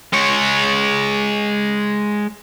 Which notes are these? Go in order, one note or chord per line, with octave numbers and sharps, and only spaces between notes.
G#3 C#5